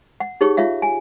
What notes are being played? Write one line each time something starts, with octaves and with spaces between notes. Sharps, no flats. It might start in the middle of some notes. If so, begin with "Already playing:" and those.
F#5
D#4 G4 G#4 C#5
F4 C#5 E5 F5
G#5